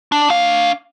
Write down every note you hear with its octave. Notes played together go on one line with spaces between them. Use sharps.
D4
D4 F5